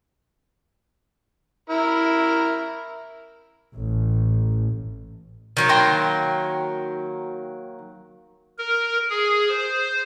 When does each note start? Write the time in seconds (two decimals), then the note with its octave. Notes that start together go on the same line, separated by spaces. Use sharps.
1.70 E4 A#4
3.75 A1
5.57 D#3 F#3 A#3
5.69 G5 A#5 C6
8.58 A#4
9.10 G#4
9.49 C5